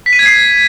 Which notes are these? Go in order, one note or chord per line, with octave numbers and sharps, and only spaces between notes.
B6
D#7
G#6
C7